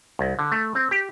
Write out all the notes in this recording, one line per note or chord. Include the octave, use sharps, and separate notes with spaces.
C2
D3
A3
C4
G4